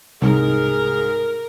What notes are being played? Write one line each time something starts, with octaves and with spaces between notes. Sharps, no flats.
C2 G#2 G#4 A#4